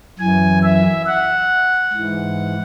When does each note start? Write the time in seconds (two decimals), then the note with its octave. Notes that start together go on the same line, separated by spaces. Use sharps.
0.19 F#2 E3 G#5
0.63 E5
1.07 F#5
1.93 G#2 E3